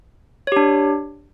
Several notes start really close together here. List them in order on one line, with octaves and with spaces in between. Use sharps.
C#5 G4 D4